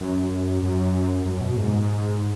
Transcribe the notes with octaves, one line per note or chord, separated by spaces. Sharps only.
F#2
F#2
F#2
B2
G#2